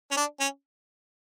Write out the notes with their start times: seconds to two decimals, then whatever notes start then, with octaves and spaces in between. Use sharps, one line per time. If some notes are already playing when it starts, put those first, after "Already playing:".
0.11 C#4
0.17 D4
0.40 C#4